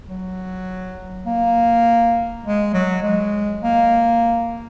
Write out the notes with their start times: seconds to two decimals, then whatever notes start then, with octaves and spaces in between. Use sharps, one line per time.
0.08 F#3
1.26 A#3
2.44 G#3
2.73 F#3
3.03 G#3
3.62 A#3